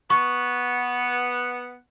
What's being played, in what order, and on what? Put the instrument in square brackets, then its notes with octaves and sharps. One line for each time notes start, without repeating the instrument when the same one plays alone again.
[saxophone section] B3 F#5 [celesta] C#6